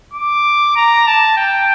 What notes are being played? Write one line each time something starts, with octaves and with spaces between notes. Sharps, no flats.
D6
A#5
A5
G5